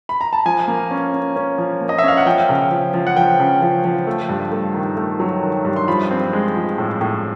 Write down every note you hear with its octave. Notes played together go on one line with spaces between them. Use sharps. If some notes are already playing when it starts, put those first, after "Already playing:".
B5
A#5
A5
F3 G#5
A#3
C#4
C#4
C#4
F3
A#3
D#5
E5
C#4 F5
F#5
F3 G5
C#3
F3
F3
F#5
F3 G5
C#3
F3
F3
A3
G2
A3
D#3
A3
F#3
D#3
G2
C6
F3 B5
C4
G#3
F3
A2
A2